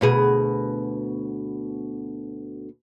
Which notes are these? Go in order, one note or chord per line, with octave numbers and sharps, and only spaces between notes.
D2 B2 G#4